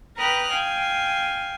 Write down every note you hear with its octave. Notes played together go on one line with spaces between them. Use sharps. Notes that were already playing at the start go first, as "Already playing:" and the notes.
B4 G5 A#5 D#6 F6 F#6
F5 G5 G#5